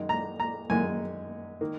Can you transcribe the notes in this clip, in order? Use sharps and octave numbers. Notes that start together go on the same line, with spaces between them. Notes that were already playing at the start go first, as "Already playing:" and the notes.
Already playing: F#2 D#3 G#3 D#4
A#5
A#5
F#2 D#3 G#3 D#4 G#5
D#3 A#3